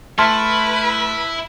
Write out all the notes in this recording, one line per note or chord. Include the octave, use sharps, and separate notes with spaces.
A3 E4 B4 A5 C6 F6